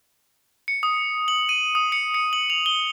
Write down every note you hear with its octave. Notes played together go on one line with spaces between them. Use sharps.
C#7
D#6
F#7
D#7
D#6
C#7
C#7
F#7
F7
G7